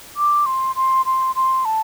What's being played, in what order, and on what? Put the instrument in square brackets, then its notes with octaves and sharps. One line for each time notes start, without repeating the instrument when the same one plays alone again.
[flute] D6
C6
C6
C6
C6
A5